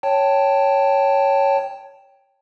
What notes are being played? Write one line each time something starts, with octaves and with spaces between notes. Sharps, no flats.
C#5 G5 A5